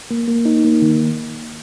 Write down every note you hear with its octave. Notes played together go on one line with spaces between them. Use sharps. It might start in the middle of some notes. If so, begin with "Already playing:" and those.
A#3
A#3
D#4
A#3
D#3